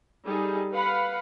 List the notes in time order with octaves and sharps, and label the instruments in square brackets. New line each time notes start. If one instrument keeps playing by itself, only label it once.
[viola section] G3 D#4 G#4 A4
B4 F5 F#5 B5